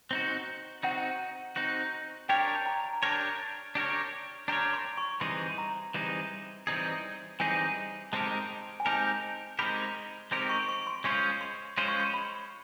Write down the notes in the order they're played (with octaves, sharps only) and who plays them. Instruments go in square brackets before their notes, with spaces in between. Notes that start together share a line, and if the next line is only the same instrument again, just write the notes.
[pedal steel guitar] C4 D#4 F#4
[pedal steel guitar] C4 D#4 F#4 [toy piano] F#5
[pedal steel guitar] C4 D#4 F#4
[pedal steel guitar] D4 G4 A#4 C#5 [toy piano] G5
[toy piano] A5
A#5
A#5
[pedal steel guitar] D4 G4 A#4 C#5 [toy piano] A5
[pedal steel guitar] D4 G4 A#4 C#5
[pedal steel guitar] D4 G4 A#4 C#5 [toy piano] A#5
[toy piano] C6
C#6
[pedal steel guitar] E3 G3 C4 D#4 G#4 [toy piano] C6
[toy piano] C6
A#5
[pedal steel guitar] E3 G3 C4 D#4 G#4
E3 G3 C4 D#4 G#4
[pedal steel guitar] E3 G3 C4 D#4 G#4 [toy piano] G#5
[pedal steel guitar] G#3 C4 D#4 G4 A#4 [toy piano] A5
[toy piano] G#5
[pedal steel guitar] G#3 C4 D#4 G4 A#4 [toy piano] A5
[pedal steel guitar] G#3 C4 D#4 G4 A#4 [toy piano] B5
[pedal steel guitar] G#3 C4 D#4 G4 A#4 [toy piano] C6
[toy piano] C#6
C#6
C6
[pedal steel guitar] G#3 C#4 F4 G#4 C5 [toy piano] C#6
[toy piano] C6
[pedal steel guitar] G#3 C#4 F4 G#4 C5 [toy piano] C6
[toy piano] C#6
C6
B5